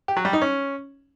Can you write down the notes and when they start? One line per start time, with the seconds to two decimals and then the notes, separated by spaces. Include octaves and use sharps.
0.08 G4
0.17 F#3
0.25 G3
0.33 D#4
0.42 C#4